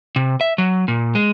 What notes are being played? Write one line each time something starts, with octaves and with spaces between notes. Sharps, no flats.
C3
E5
F#3
A#2
G#3